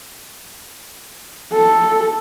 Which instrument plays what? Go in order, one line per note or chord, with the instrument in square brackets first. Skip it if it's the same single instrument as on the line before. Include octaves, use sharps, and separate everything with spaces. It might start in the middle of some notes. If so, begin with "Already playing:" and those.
[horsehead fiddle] A4